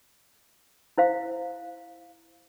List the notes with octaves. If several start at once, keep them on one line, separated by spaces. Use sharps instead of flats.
E4 C5 F5